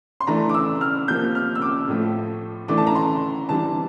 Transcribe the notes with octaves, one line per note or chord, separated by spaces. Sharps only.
C6
E3 A3 D4 A#5
D6
E6
F6
C3 F3 A#3 G6
F6
E6
D6
A2 F3 A3
E3 A3 D4 D6
A5
A#5
C6
C3 E3 G3 D4 A5